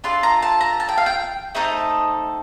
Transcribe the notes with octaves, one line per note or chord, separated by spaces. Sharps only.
D4 F4 A4 C6
A#5
A5
A#5
A5
G5
F5
G5
A3 C4 D#4 A4 D#5